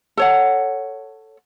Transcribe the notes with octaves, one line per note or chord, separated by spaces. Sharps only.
A4 C#5 F#5